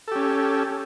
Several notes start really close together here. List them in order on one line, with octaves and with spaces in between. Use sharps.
A4 G4 C#4